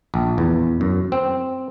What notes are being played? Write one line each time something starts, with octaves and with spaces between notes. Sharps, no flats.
A#1
E2
F#2
C4